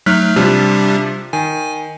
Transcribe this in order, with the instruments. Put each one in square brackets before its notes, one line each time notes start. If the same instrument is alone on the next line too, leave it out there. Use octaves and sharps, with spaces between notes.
[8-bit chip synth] F#3 A3 D#4 [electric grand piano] F6 F#6 B6
[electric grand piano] C3 F3 [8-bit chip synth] G3 D4 G4
[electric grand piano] D#3 [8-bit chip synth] G#5